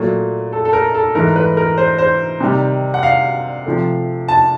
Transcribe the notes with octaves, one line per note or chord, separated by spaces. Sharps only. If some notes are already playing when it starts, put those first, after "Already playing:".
Already playing: A#2 F#3 A3
A4
A4
A#4
A4
G#2 E3 A3 A#4
B4
A#4
C5
C5
C3 D#3 G3
F#5
F5
C3 F3 A3
A5